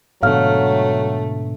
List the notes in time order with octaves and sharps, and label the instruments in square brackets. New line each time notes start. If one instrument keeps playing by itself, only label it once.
[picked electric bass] G#2 B2 D3 [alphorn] F#3 [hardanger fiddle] A3 [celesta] F5 F6